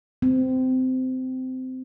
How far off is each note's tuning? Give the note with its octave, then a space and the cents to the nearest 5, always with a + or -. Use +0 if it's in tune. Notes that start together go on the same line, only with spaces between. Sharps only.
C4 -20